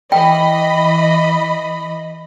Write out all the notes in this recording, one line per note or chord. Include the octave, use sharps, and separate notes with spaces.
E3 D#5 G5 B5